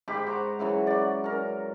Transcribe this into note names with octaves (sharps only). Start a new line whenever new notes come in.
G#2 G4 B5 D6
F#4 C5 A#5
G#2 C#3 E3 F#3
F#4 D5
C#4 A#4